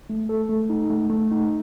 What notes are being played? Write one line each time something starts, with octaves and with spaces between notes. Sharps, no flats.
A3
A4
A3
D#4
A3
A3
D#4